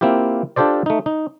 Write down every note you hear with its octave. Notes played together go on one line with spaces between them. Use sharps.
A#3 C4 E4 F4 G4
D4 F4 G4 A4 C5 D5
A3 D#4
D#4